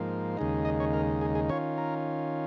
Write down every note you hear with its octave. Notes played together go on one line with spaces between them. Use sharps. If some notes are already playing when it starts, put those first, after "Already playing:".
Already playing: G#2 F3 A#3
D#2 C#3 G#3 D#4
D#5
C#5
A#4
G#4
G#4
D#3 C#4 F4 C#5
A#4